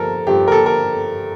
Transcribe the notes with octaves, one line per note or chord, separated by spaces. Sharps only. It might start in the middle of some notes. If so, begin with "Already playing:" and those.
Already playing: G2 F3 A4 A#4
G2 F3 G4
A#4
A4
A#4